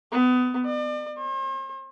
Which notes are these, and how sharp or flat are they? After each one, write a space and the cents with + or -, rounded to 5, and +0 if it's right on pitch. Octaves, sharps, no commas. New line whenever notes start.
B3 +25
D5 +40
C5 +45